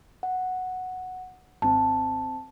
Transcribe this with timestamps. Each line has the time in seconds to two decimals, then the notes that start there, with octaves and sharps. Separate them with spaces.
0.23 F#5
1.62 G#1 C4 A5